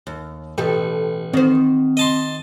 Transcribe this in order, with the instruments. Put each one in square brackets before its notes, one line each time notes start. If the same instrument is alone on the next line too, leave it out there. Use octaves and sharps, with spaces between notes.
[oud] D#2
[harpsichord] A1 [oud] B2 G4 A4
[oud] D#3 C5 [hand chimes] C4
[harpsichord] D#5 A5 C6